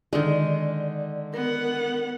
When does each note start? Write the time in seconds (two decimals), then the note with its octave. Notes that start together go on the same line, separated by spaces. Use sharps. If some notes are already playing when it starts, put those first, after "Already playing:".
0.13 D3 D#3 G#3 D#4 D5
1.34 B3 A#4 F#5